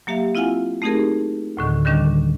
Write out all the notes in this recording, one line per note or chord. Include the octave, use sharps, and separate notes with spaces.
F#3 A#3 G4 E5 F5
C4 E4 F4 F5 F#5 G#5
A3 C4 D#4 G4 G#4 A#4
D2 A2 D3 D#3
D3 D#3 G3 C#4 D4